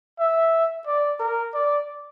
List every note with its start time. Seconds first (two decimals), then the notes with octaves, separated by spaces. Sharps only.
0.19 E5
0.87 D5
1.19 A#4
1.54 D5